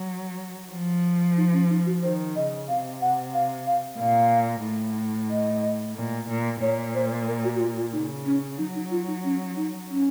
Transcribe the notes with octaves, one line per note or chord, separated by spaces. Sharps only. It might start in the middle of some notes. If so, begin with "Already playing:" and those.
Already playing: F#3
F3
D#4
C#4
D#4
F#4
D#3 C5
C#3 D#5
C3 F5
F#5
F5
F5
A#2 F5
A2
D#5
A#2
A#2
A#2 C#5
C5
A#4
F#4
F#4
F4
F4
C#3 D#4
C#4
F#3 D#4
D#4
F4
D#4
C#4
D#4
C#4